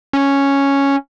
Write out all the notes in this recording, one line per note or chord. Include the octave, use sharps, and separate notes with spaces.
C#4